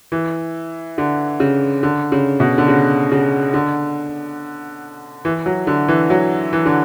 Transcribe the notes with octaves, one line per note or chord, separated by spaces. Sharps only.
E3
D3
C#3
D3
C#3
B2
D3
C#3
C#3
D3
E3
F#3
D3
E3
F#3
E3
D3